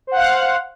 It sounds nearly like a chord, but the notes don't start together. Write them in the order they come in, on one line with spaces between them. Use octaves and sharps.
C5 F#5 F5